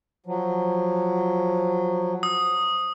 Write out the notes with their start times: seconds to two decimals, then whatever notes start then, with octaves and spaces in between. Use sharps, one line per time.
0.26 F3 F#3
2.23 D#6